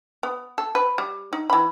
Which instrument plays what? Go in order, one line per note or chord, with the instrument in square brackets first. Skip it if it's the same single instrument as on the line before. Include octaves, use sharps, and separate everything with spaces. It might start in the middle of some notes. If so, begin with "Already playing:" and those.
[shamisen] B3
A4
B4
G3
D#4
E3 B5